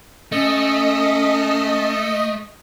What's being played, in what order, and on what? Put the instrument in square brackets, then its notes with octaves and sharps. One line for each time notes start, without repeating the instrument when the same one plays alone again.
[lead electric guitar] A3 [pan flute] C#4 [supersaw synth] D#5